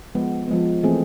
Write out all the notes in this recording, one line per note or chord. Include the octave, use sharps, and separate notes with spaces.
F3 G#3 B3
F3 G#3 B3
E3 A3 C4 G#4